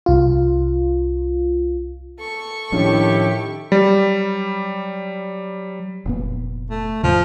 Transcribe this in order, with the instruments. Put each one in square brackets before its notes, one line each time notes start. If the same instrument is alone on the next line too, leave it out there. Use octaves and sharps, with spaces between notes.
[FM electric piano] C2 F4
[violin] A4 C#6
[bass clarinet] A2 [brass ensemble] D#3 E4 G4 [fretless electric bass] F3 C#4 D4
[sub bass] F#3 [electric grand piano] G3
[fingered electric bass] F1 A#2 B3
[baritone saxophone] A3
[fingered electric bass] E2 G#2 C#3 [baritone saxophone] F3